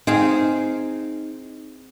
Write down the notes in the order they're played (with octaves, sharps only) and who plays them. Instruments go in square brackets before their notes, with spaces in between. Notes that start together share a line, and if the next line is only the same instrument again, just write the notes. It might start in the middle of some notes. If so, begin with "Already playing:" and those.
[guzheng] C4 G#4 F5 [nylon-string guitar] D#4